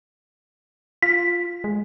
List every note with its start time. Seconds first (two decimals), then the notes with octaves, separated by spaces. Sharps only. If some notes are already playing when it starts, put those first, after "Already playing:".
1.02 F4 B6
1.64 G#3